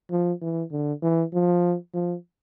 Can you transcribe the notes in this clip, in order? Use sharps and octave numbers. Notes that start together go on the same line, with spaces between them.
F3
E3
D3
E3
F3
F3